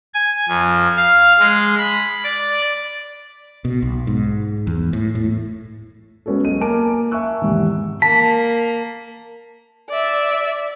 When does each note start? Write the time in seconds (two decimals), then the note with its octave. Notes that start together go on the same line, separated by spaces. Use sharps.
0.14 G#5
0.49 F2
0.97 F5
1.39 G#3
1.78 B5
2.24 D5
3.65 B2
3.82 B1
4.07 G#2
4.67 E2
4.93 A2
5.15 A2
6.26 G#3 B3 C#4 F#4 A4
6.44 B1 D#5 D#7
6.61 A#3 A#4 G#5 A5 D6 D7
7.11 E5 G#5 A5 C#6 E6 F#6
7.42 E2 G#2 C3 D#3
8.02 A#3 A5 B6
9.89 D5 E5